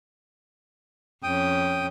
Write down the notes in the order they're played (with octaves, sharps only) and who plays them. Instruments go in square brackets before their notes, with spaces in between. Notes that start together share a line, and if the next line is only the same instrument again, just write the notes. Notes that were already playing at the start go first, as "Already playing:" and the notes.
[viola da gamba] F2 C#4 [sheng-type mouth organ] G5 D#6